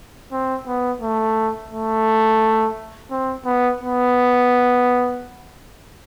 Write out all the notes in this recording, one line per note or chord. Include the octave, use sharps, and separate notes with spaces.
C4
B3
A3
A3
C4
B3
B3